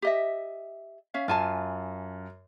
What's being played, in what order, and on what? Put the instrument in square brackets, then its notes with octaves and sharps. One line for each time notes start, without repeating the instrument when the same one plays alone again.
[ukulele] G4 D#5 E5
C#4 E5 F5
[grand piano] F#2 [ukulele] F4 G#5 A5